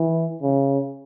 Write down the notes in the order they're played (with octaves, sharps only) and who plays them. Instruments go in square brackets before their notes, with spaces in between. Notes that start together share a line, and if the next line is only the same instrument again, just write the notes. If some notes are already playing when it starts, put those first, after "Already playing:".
Already playing: [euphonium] E3
C#3